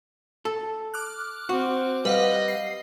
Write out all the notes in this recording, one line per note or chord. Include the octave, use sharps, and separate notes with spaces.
A4
D6 F6 F#6
C4 F#4
G3 B4 D#5 F5 F#5
C7